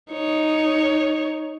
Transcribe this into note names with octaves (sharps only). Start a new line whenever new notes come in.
D#4 C#5